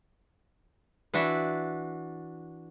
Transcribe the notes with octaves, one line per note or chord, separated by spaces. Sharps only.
E3 D4 F#4 E5